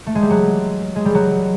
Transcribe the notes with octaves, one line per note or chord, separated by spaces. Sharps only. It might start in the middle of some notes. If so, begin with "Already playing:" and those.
A3
G#3
G3
F#3
G#3
G3
F#3